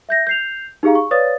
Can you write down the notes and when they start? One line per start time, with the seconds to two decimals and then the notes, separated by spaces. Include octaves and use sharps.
0.09 E5 G6 A#6
0.27 G6 C7 F7
0.83 D#4 G4 G#4 F5 A#5
0.95 C#6
1.11 B4 C#5 D5 F5 D#6 A6